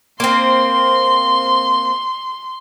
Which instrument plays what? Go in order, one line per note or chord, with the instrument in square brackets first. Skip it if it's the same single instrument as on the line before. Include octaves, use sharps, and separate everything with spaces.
[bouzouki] A#3 C4 [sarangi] C6